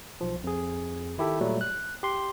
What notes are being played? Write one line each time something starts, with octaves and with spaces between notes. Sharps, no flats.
B1 F3
F2 G#4
D#3 E4 G4 A4
A#2 F#3 G3 A3
F#6
G4 C6